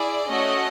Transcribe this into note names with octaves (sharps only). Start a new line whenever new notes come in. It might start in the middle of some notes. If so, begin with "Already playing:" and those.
Already playing: E4 G#4 D5
A3 C#4 F#4 D#5